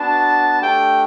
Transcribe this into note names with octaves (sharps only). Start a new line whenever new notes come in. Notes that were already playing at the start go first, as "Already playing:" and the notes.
Already playing: B3 D4 F#4 A5
A3 D4 G4 G5